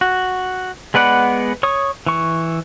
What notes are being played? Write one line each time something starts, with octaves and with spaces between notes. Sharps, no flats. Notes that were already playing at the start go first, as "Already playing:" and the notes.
F#4
G#3 B3 B4 D5 F#5
C#5 C#6 D#6
E3 C#6